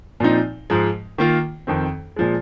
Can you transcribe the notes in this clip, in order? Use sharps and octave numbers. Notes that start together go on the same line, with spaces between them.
A#2 F3 C4 D#4
G#2 F3 G#3
D#3 A#3 F4
F2 D#3 C4
A#2 F3 G#3